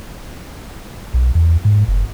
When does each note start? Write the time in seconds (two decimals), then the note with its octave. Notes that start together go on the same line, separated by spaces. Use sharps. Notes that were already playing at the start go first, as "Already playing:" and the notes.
1.14 B1
1.35 E2
1.65 G#2
1.88 F#1